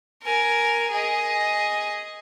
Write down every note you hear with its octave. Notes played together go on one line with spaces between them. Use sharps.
A#4 G#5
G#4 D#5